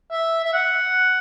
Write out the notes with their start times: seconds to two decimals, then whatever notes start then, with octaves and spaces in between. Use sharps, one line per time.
0.11 E5
0.44 E5
0.53 F#5